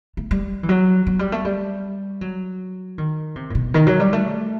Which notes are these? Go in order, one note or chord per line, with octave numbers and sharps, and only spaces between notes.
A3
G3
E3
F#3
F#3
G3
A3
G3
F#3
D#3
C3
A2
B2
D#3
F#3
G3
A3